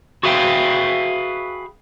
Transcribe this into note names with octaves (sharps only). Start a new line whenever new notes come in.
F#4 G#4 B4 E5 F5 G5